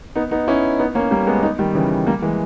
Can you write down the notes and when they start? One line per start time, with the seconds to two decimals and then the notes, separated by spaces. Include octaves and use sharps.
0.15 B3 D#4
0.31 B3 D#4
0.47 C#4 E4
0.79 B3 D#4
0.95 A#3 C#4
1.11 G3 A#3
1.27 G#3 B3
1.43 B3 D#4
1.59 D#3 G3
1.75 C#3 E3
2.06 G3 A#3
2.22 E3 G#3